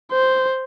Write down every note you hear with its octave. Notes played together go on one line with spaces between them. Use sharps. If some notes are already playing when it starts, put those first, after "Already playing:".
C5